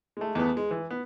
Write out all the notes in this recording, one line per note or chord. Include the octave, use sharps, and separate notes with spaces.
G#3 A3
E2 A3 B3
G#3
E3
B3